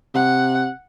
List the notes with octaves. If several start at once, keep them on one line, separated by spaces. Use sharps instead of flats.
C3 F#5